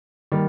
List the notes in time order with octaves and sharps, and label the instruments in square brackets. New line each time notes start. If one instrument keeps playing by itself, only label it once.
[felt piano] D#3 G3 A#3